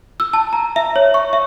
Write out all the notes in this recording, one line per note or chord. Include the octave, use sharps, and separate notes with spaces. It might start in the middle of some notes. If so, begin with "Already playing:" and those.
E6
A5
A#5
E5
C#5
C#6
E5